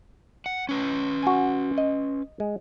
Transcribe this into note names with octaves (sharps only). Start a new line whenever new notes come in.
F#5
C#4 B4
F#4 G#5
D#5
G#3